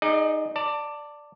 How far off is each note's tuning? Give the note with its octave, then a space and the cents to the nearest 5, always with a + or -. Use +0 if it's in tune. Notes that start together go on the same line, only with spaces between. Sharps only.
D#4 +0 G#4 +0 D5 +30
D5 +0 A5 +25